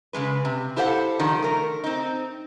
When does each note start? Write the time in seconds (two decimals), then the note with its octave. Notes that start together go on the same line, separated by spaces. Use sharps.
0.13 C#3 F3 G#3 B4
0.45 C3
0.76 E4 G4 A4 C5 F5 F#5
1.19 D#3 F3 G3
1.43 A3 A#4
1.84 C4 D#4